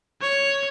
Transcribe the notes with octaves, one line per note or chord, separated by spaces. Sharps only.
C#5